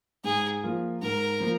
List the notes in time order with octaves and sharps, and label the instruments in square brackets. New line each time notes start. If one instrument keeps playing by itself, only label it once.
[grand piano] G#2 [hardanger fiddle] G#4
[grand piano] F3 A#3 F4
[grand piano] G#2 [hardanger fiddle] A#4
[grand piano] F3 A#3 F4